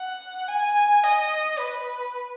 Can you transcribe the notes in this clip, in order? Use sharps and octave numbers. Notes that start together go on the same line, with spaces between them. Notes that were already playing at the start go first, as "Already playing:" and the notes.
Already playing: F#5
G#5
D#5
B4